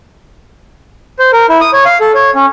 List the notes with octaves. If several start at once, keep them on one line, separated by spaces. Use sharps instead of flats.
C5
A#4
E4
D#6
C#5
F5
A4
C#5
C#4